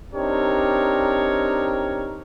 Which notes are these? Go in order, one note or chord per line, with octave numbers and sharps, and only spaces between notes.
C4 D4 D#4 G4 A#4 C#5